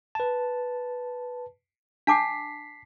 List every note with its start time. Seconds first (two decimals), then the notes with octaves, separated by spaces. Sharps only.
0.15 B4 A5
2.07 D4 A5 D6 B6 C7